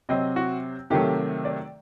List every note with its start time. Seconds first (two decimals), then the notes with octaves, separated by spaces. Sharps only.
0.09 C3 F#3 C4 D#5
0.36 F#4
0.90 C3 D#3 F#3 A3 G4
1.45 D5